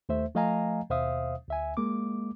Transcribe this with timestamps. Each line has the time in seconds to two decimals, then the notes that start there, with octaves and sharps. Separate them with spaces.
0.09 D#2 A3 C5 E5
0.35 F3 A3 D#5 F5 G#5 A#5
0.90 D#2 B2 C5 E5 F5 D#6
1.48 D2 E5 G#5
1.77 G#3 A#3 D6